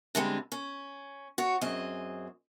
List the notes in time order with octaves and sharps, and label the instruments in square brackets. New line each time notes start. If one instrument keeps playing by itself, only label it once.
[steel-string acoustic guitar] D3 G3 G#3 C4
C#4
F#4 C#5
F#2 C4 G#4 D#5